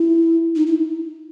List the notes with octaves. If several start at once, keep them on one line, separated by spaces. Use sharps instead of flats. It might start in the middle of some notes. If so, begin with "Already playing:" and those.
Already playing: E4
D#4
E4